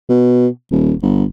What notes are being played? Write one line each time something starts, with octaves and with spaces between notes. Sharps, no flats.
B2
D#1
G1